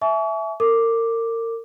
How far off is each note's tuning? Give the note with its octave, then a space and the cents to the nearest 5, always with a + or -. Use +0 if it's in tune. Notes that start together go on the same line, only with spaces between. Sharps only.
E5 +0 G#5 +40 C#6 +40
A#4 -35 D6 +0